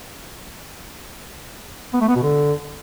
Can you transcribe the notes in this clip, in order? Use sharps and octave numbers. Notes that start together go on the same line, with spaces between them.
B3
A3
B3
B2
D3